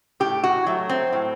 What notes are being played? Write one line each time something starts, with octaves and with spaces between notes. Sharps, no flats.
A2 G4
F#4
F#3 A3
C4
A2